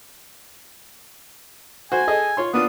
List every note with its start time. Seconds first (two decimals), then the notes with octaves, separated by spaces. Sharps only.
1.92 F#4 C5 G#5
2.07 G#4 A4 D#5
2.37 F4 C#5 C6
2.54 B3 D4 F4 D#6